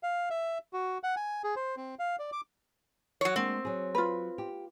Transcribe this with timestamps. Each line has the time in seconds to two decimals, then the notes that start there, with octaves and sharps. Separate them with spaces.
0.03 F5
0.30 E5
0.73 F#4
1.04 F#5
1.16 G#5
1.44 G#4
1.56 C5
1.77 C4
1.99 F5
2.19 D5
2.32 D6
3.21 F#3 C#5
3.36 G#3 A#3 C4 D4
3.65 F#3 G#4
3.95 F4 B4
4.38 G4